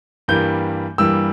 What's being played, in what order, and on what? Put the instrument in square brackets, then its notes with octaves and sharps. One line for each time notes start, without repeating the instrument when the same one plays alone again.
[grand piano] G2 E3 G3 A#3 G6
G2 E3 G3 A#3 E6